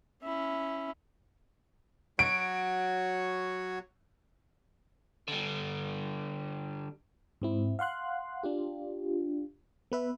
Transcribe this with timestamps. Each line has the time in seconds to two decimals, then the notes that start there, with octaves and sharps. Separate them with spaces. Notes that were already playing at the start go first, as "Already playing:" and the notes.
0.22 C#4 E4
2.19 F#3 F#4 C#5 D7
5.28 D3 G3
7.42 G#2 C4 E4
7.79 F5 F#5 C6 F#6
8.43 D4 F4 G4
9.92 B3 B4 E5